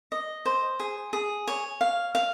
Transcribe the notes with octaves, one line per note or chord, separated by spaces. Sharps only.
D#5
C5
G#4
G#4
C#5
F5
F5